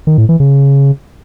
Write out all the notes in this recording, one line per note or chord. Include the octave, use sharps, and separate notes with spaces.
D#3
A2
E3
C#3